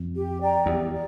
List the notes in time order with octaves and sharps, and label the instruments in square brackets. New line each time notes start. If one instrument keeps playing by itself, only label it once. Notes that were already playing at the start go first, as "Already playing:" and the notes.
Already playing: [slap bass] F2
[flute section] G4
D5 G5 A#5
[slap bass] E2 [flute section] G4
[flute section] D5